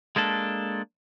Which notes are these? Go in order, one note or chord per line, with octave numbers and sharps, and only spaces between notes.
G#3 A#3 D4 A4